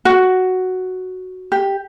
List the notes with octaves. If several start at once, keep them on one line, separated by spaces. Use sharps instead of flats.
F#4
G4